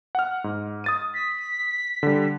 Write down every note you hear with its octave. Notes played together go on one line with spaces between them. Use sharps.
F#5 F6
G#2
D#6 A6 D#7
B6
D3 G3